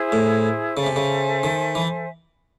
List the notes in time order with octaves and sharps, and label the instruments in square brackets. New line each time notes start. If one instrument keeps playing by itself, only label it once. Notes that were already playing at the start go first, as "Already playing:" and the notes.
Already playing: [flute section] E4 G#4 C5
[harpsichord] A2
[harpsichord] C#3 [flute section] A4 C5 E5 G#5
[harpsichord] C3
C#3
D#3
E3